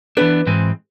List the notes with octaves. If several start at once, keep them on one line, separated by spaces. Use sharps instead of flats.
E3 B3 D4 B4
G#2 E3 G#3 C4